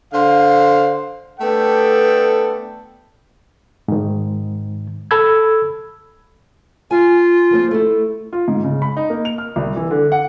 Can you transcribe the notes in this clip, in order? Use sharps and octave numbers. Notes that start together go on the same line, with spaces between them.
D3 C5 F5
A3 B3 D4 A4 G5
G#2 D#3
A4 B5 E6 G#6
F4 G#5
F3 A#3 C4
A3 E4
F4
G#2
C#3
B5
D#4
A#3
F7
F6
C2
E3
D3
F#5